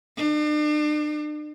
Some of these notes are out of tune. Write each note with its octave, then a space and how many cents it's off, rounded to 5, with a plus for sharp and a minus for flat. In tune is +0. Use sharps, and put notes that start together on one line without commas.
D4 +40